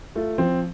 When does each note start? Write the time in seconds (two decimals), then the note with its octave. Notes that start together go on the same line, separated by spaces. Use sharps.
0.15 A3 F4
0.38 F3 C4